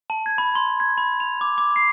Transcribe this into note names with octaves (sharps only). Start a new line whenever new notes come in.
A5
G#6
B5
C6
G#6
B5
F7
D6
D6
C7